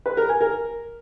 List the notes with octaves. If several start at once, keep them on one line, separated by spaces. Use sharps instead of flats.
B4
A#4
G#5
A#4